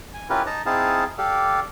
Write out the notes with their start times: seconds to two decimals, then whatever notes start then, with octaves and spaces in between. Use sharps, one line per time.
0.14 G#5
0.30 C#4 E4 F4 G4 A#4 B4
0.46 D#4 A5 A#5
0.66 C4 D#4 E4 G#4 F5 A5
1.18 G4 A4 D5 F5